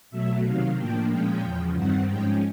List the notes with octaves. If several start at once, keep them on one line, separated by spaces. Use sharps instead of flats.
B2 F#3 A3 E5
C3 D#3 F#3 F5
A2 F3 A#3 D4 G5
A#2 F3 G#3 C#4 G5
E2 C#3 F3
G2 D#3 G3 C4 F#5
G#2 F3 G#3 C#4 G5